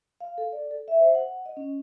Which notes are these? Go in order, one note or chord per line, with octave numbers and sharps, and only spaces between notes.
F5
A4
D5
A4
E5
C5
F#5
D#5
C#4